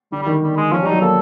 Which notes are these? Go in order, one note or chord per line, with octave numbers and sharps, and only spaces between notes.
D3 G3
G3
D#3
G3
G#3
F3 C#4
G3
D#4
F#3
A#3 A4